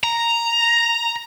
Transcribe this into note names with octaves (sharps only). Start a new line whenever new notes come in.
A#5